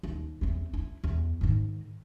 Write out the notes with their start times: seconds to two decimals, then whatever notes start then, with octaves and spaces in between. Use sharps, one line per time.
0.03 D#2
0.41 E2 C4
0.74 E4
1.04 E2
1.41 G#2 D#3